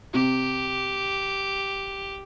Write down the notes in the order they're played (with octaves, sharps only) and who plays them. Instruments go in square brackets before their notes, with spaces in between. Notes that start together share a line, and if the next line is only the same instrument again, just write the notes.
[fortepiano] C3 [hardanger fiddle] G4